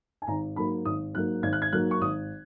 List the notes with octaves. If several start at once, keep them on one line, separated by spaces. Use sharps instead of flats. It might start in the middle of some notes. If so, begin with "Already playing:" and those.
G#5
G#1 A#5
G#2 F#3 A#3 B5
G#1 D#6
G#2 F#3 A#3 F#6
G#1 G#6
F#6
G#6
G#2 F#3 A#3 F#6
C#6
G#1 D#6